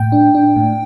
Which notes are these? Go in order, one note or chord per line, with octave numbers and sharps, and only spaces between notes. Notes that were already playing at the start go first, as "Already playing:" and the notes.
Already playing: A2 G5
D4
D4
A2